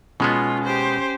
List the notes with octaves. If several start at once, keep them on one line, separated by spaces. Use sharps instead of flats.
B2 G#3 B3 C#4 F4
G4 C5